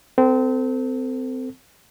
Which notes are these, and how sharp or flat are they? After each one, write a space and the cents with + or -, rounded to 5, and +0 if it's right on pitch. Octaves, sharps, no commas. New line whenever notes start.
C4 -25 A4 +25